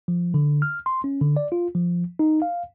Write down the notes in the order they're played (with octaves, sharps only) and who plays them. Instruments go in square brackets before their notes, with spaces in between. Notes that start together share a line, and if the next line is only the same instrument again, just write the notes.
[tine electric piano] F3
D3
F6
C6
C#4
D3
D5
F4
F3
D#4
F5